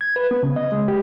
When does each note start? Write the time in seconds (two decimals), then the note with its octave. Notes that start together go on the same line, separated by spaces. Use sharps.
0.01 G#6
0.16 B4
0.31 B3
0.43 C#3
0.56 D#5
0.72 G#3
0.88 G4